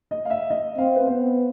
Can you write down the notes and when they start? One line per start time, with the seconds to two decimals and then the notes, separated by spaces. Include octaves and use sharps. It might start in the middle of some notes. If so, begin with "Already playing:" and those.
0.11 D#5
0.25 F5
0.30 E5
0.50 D#5
0.78 C4 F5
0.96 B4
1.07 B3 C5